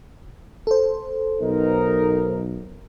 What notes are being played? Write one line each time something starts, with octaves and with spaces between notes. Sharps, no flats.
A4 C5
B1 B3 D#4 A#4